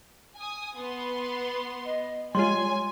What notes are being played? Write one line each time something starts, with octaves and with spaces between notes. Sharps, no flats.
G#5 D#6
B3 C6
D#5
G3 G#3 F4 C#5 G#5 C6